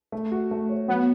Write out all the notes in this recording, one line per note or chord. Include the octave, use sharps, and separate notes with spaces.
A3
F#4
A3
C#5
F#3 B3